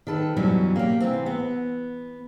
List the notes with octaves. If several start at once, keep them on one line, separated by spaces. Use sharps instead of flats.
D#3 A4 B4
F#2 B2 E3 F#3 G3 C#4
A#3 G4
C3 E3 C4
B3